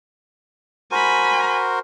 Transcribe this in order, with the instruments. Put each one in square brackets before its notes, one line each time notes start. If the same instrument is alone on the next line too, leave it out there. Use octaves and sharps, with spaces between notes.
[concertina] F#4 A#4 C5 [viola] G#5 B5